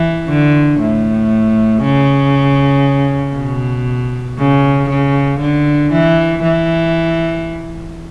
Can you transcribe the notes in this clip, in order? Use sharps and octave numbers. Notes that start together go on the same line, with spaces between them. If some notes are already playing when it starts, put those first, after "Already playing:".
Already playing: E3
D3
A2
C#3
B2
C#3
C#3
D3
E3
E3